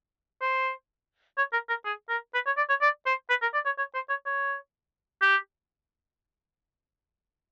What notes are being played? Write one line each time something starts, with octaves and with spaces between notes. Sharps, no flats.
C5
C#5
A#4
A#4
G#4
A#4
B4
C#5
D5
C#5
D5
C5
B4
A#4
D5
C#5
C#5
C5
C#5
C#5
G4